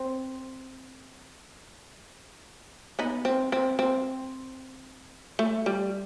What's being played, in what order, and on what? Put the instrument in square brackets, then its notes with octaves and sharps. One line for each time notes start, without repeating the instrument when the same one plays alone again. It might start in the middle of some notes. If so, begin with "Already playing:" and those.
Already playing: [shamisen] C4
B3 D#4
C4
C4
C4
A3
G3